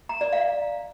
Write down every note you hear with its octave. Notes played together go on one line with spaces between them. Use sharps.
A#5
D5
F5